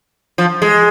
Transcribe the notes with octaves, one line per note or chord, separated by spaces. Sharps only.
F3
G#3